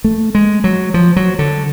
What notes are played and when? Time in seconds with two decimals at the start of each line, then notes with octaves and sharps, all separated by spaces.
0.04 A3
0.35 G#3
0.64 F#3
0.94 F3
1.16 F#3
1.39 D3